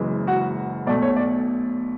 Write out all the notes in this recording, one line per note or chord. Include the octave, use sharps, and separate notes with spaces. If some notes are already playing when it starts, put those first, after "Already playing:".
Already playing: F#1 F#2 E3 G#3
F#4 F#5
B1 B2 A3 D5
C#5
D5